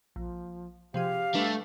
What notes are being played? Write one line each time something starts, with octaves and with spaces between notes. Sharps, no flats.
A#1 F3
C3 F3 G4 G#4 F5
G3 A3 D4 B4